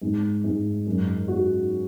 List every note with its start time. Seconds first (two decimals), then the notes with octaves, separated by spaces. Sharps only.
0.01 G#2
0.44 G#2
0.86 F#2
1.28 F#4